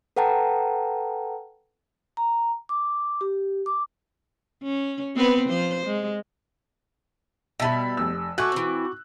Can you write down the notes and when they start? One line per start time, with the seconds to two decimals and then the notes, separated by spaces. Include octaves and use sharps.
0.16 A4 B4 F#5 G5 A5 A#5
2.17 A#5
2.69 D6
3.21 G4
3.66 D6
4.63 C#4
5.15 B3 C4 B4
5.49 F3 C5
5.86 G#3
7.60 B2 G3 E5 A5 B5
7.97 F1 E6
8.38 A3 F#4 G#5 C#6 D6 F#6
8.52 E3 C4